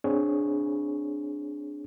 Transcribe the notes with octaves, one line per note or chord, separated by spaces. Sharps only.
C4 D4 G#4 C#5